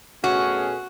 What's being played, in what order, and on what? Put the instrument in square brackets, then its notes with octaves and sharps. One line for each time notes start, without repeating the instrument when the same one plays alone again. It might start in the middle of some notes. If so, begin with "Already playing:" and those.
[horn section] B2 A3 C#4 G#4 [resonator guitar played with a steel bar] F#4